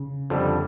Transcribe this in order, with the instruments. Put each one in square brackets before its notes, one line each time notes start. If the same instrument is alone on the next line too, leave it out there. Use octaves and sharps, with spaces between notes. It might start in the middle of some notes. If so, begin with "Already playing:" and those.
Already playing: [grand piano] C#3
[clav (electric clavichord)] F2 D3 G3